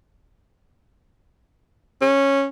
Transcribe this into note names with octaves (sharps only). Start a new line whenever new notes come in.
C#4